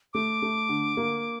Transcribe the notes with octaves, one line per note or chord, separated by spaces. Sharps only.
A3 D6
A3
D3
A#3